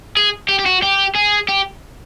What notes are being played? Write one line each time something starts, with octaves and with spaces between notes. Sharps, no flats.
G#4
G4
G4
F#4
G4
G#4
G4